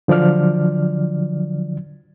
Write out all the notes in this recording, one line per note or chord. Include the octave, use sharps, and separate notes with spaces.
D3 F3 F#3 D5 F6